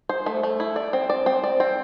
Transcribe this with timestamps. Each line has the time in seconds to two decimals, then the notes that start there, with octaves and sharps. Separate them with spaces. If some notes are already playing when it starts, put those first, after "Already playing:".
0.09 C5
0.26 A3
0.43 A3
0.60 E4
0.76 D5
0.93 C4
1.10 D5
1.26 C4
1.44 D5
1.60 C4